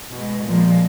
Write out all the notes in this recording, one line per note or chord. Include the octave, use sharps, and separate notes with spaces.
B2 G#3
A#2 F3 G#3